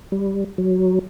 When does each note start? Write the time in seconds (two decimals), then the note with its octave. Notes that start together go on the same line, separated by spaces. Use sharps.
0.12 G3
0.58 F#3